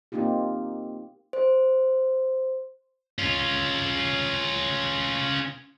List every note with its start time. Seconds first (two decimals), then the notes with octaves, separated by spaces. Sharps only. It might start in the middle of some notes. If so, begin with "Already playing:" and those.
0.12 A#3 C4 D#4 F4 G4
1.33 C5
3.19 C#4 F4